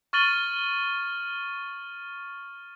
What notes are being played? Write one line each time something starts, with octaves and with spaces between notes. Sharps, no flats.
C#6 F6 A6 D#7 F#7 G7